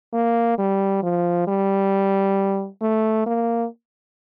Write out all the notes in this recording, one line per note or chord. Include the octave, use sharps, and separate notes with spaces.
A#3
G3
F3
G3
A3
A#3